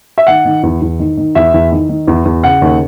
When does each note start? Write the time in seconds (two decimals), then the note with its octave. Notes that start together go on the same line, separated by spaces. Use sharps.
0.18 E5
0.27 D#3 F#5
0.45 D#3
0.63 E2
0.82 E2
0.99 D#3
1.17 D#3
1.35 E2 E5
1.54 E2
1.72 D#3
1.89 D#3
2.08 E2
2.25 E2
2.44 C#3 F#5
2.62 D#2